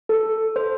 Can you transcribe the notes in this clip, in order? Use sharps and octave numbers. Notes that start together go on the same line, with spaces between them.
A4
C5